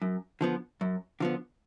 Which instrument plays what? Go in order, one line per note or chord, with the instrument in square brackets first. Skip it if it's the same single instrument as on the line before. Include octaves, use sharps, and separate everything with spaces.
[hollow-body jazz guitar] F#2
D3 F3 B3
F#2
D3 F3 B3